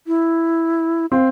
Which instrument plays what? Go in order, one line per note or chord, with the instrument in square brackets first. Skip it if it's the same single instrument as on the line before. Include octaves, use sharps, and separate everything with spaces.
[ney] E4
[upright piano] C4 [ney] F5